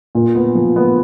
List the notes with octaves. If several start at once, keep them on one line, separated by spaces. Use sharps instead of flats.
A#2
B3
F3
B3